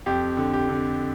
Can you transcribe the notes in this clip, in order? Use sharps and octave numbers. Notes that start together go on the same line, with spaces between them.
F2 G4
D3
G4
D3